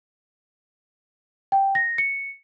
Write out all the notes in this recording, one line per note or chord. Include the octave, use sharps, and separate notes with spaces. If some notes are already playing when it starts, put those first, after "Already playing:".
G5
A#6
C#7